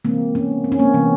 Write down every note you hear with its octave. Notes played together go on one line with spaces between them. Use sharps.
C3 E3 G#3 A#3 C4
B3 C#4
C4
C#4
A#3 C4
C3 E3 G#3 B3